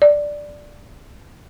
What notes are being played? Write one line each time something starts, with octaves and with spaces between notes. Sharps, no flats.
D5